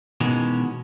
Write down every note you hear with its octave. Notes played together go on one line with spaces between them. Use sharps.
B2 D#3 E3 G#3 C#4